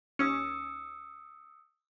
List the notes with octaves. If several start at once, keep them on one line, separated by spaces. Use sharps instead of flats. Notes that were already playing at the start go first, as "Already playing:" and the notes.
D#2 C#4 D#6 E6 C#7